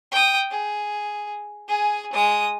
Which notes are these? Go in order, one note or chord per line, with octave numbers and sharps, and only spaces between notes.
G5 D#6
G#4
G#4 G#5
G#3 D#6